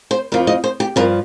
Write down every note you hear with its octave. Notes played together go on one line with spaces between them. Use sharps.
C5
F2 F3 A#4
D#5
C5
G4
G2 F3 A#4